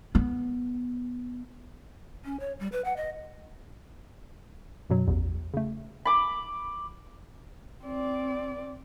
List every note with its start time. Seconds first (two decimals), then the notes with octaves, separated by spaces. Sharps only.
0.15 B3
2.25 C#4
2.40 C#5
2.59 G3
2.72 B4
2.84 F#5
2.96 D#5
4.90 F#2 B2 F#3
5.07 A1 E2
5.54 C#3 A3
6.05 B5 D6
7.84 C4 D5